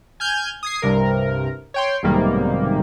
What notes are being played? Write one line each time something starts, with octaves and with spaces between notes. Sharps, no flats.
G#5 F6 G6 G#6
D#6 G#6 C7
C2 G2 C3 A#4
C#5 G5 C6
B1 G#2 C3 D#3 G3 A#3